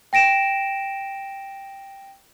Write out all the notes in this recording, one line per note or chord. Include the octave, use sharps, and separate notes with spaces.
G5 A#6 D7 E7